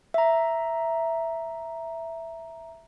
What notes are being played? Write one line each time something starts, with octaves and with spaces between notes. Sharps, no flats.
E5 A#5